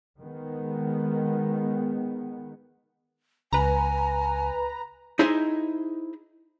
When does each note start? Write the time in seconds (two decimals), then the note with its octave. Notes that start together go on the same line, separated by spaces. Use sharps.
0.19 D#3 G#3 B3
3.53 C#2 B4 G#5 A#5
5.19 D#4 E4 G#4 C5 D#5 E5